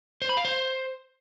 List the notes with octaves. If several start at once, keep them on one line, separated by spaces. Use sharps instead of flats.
C5
B5
F5
C5